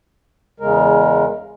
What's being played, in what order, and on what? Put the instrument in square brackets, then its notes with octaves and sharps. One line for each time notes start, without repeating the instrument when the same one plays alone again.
[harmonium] E2 C#3 G#3 A#4